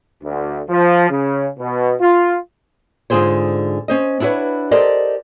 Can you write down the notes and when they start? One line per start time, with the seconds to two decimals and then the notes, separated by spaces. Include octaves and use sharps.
0.23 D2
0.69 F3
1.10 C#3
1.58 B2
2.01 F4
3.10 G#2 D3 F4 G#4 C5 C#5
3.88 C#4 C5 D#5
4.20 D4 E4 F#4 B4 C#5
4.71 G4 A4 A#4 C5 D5 D#5